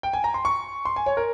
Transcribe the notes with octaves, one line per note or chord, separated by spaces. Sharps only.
G5
G#5
A#5
C6
C#6
C6
G#5
C#5
A#4